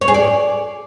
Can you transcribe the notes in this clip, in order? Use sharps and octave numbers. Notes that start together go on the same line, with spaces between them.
C#5
G#4
D5